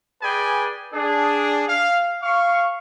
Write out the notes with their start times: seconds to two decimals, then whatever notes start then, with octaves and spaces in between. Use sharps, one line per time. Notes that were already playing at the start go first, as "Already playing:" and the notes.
0.23 G#4 B4 D5 G5 G#5
0.93 D4 G#4
1.69 F5
2.23 F5 C#6